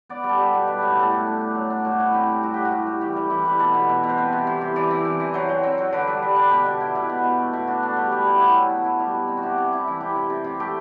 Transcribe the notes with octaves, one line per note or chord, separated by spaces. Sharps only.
B3 D5
G3
A4
G3 G4
B2
G3 B4
A2 A4
G4
A2 A4
A2
D4
D4
F#3
D4
A2 F#4
E4
C4 G4
C4
G3 F#4
A2 G4
F#4
A2
G3
E3 G4
G3
E3
G3 B4
B2 A4
B2
B2
B2
C5
C4 B4
C3
E3 C5
C3
E3 D5
C4
E3
E3
F#3 C5
F#3
C4
F#3
D3 B4
G3
G3
D4
B2 G4
B2
E4
B2
B2
B2
A3
B2
D4 F#4
D4 A4
G3 G4
G3 G4
E4 F#4
E4
F#3
B3
E4
G3
B2
C4
F#4
C3 G4
C3
E4
E3
C3 G4
C3
C3
C3
A3 G4